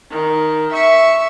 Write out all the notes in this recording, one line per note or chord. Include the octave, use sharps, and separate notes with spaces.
D#3
E5 C#6